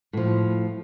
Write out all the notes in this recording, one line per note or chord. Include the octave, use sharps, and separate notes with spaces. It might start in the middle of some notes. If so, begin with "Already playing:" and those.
A2 F3